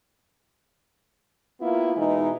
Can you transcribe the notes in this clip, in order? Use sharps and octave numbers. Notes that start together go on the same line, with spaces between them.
A#3 B3 E4 F4
B2 E3 G#3 D#4